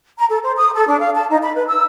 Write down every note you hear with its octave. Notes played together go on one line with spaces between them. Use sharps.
A#5
A4
C5
D#6
A4
D4
F5
A5
D#4
B5
B4
E6